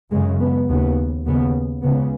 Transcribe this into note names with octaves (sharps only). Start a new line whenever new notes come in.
F#2 C#3 G#3
B3
D#2 C#3 B3
D#2 C#3 B3
C#2 C#3 B3